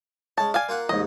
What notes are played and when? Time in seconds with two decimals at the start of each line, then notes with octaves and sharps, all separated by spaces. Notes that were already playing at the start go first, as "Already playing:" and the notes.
0.38 G#3 C#4 A5
0.54 D5 F5 G#5
0.69 A#3 F4 F#5
0.89 A1 D#2 G#2 D#5